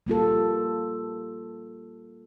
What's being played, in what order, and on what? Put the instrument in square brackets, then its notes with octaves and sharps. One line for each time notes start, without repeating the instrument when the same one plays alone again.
[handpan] G3 A#3 F4 A4